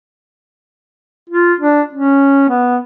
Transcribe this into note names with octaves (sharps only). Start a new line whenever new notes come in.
F4
D4
C#4
B3